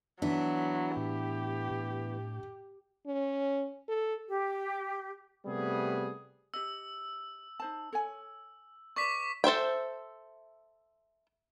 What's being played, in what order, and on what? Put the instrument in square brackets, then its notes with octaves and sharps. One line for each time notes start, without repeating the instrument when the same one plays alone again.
[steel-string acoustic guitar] E3 B3 E4 [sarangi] F#3 [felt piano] D4
[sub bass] A2 [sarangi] G4
[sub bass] A2
[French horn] C#4
A4
[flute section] G4
[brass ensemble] C3 G3 A3 B3 G#4
[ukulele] G4 D#5 [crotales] E6
[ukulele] D#4 C5 A5
A4 C#5 G#5
[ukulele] B4 D5 [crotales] C#6 D6 B6
[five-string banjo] A4 C5 E5 G5